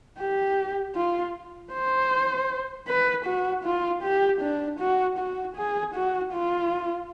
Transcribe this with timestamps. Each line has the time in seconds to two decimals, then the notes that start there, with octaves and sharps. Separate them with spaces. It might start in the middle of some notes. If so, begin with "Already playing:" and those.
0.19 G4
0.95 F4
1.73 C5
2.88 B4
3.26 F#4
3.64 F4
4.03 G4
4.41 D4
4.80 F#4
5.18 F#4
5.56 G#4
5.95 F#4
6.33 F4